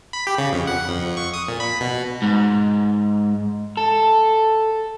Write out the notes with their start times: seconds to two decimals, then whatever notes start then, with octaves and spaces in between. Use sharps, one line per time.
0.13 B5
0.27 G4
0.38 C#3
0.52 F2
0.67 F#5
0.88 F2
1.17 C#6
1.34 D#6
1.48 A#2
1.60 B5
1.81 B2
2.22 G#2
3.77 A4